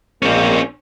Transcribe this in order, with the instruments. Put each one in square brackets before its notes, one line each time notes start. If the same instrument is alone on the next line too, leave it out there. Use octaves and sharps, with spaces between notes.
[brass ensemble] A#1 G#3 A#3 [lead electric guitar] C4 C#4